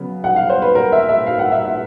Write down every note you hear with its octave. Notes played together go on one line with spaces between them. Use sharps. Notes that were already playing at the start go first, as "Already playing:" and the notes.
Already playing: C#3 F#3 B3
F#5
F5
C5
B4
A#4
E5
E5
F5
F#5
E5
E5